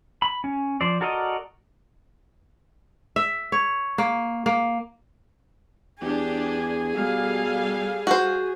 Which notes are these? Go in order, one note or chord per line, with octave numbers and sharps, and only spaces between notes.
B5
C#4
F3 C5 D5
F#4 A4 A#4 D5 D#5
E5
C#5
A#3
A#3
E2 D4 G4 G#4
B2 G3 A4 F5
F#4 C5